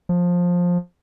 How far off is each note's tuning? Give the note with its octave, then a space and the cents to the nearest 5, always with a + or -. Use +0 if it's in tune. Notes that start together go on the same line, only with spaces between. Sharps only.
F3 +15